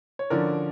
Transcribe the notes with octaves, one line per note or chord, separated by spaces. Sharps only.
C#5
D3 F3 C#4 A#4 D5